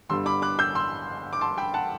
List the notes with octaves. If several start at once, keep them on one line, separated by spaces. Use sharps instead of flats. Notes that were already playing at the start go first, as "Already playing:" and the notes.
G1 G2 D3 G3 C6 E6
B5 D6
D6 F#6
E6 G6
C6 E6
D6
A5 C6
G5 B5
F#5 A5